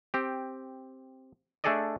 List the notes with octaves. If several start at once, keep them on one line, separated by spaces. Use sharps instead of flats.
C4 G4
A3 D4 G#4 A4 D5 D#5